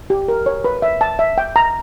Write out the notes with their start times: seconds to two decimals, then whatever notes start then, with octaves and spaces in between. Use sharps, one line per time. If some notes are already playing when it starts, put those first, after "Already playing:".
0.10 G4
0.28 A#4
0.46 C#5
0.64 B4
0.82 E5
1.01 A5
1.19 E5
1.38 G5
1.56 A#5